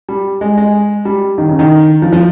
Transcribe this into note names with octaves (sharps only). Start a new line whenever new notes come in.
G3
G#3
G#3
G3
D#3
C#3
D#3
F3
F3